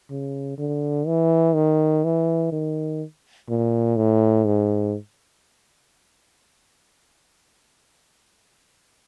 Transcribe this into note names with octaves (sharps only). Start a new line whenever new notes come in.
C#3
D3
E3
D#3
E3
D#3
A#2
A2
G#2